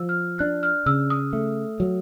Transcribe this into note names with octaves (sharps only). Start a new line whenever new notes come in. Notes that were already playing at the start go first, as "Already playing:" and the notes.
Already playing: F3 E6
F6
D4 F#6
F6
C#3 E6
D#6
A3
F#3